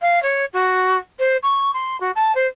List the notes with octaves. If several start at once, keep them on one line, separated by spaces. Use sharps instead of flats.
F5
C#5
F#4
C5
C#6
C6
F#4
A5
C5